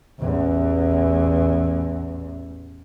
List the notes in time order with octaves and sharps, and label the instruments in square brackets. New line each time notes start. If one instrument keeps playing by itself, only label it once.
[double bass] A1 E2